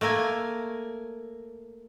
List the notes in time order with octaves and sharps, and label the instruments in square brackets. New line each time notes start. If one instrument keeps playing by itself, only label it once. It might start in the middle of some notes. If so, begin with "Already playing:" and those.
[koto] A3 A#3 A#4 G#5